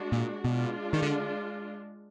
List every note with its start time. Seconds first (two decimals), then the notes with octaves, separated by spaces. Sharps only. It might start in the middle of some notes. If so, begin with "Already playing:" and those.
Already playing: G#3 D4 F#4
0.12 A#2
0.44 B2 G#3 D4 F4
0.93 D#3
1.02 D3